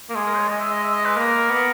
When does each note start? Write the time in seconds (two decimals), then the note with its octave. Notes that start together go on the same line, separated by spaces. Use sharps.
0.09 A#3
0.15 G#3 G#4
0.26 A#4
0.37 C#5
0.49 G#3 D#5
0.60 E5
0.72 D#5
0.83 E5
0.94 D#5
1.05 B4
1.16 A#3 A#4
1.50 B3